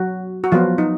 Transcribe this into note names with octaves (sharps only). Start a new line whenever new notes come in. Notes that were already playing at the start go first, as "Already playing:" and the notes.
Already playing: F#3 F#4
F#4
F3 F#3 B3 F4
D#4